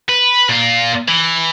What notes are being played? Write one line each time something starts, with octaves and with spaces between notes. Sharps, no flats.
B4
A#2 F4
E3